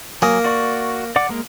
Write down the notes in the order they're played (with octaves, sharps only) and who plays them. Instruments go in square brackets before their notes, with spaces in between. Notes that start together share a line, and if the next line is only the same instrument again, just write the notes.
[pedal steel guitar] F#3 G#5 D#6 [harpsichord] A#3
[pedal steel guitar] F#4 D5 C#6
D5 F#5 D6
G#3 A#3 A#4